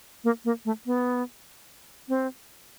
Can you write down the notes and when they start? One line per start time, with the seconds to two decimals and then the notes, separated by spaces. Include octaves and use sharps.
0.24 A#3
0.45 A#3
0.65 A3
0.86 B3
2.09 C4